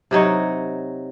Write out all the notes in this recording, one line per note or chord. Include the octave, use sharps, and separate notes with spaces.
C3 F#3 D#4 C#5